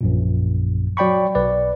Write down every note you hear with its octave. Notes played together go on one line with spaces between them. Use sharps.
A#1 F#2 A#2
F#3 D5 G5 B5 C#6
B1 B4 D5